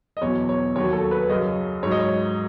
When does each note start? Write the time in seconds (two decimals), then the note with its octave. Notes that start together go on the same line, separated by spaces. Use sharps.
0.17 D#5
0.21 E2 B2 F#3 C#5
0.49 C#5
0.75 D#2 D#3 F#3 C#5
0.93 A4
1.11 B4
1.29 F#2 C#3 F#3 D#5
1.83 G#2 F#3 C#5
1.91 D#5
2.00 C#5